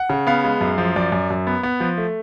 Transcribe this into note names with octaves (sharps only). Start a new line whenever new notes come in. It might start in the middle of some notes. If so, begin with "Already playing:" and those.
Already playing: F#5
C#3
B3 F5
G#3
F#2
F3
F#2 D5
F#2
F#2
B3
B3
F3
A3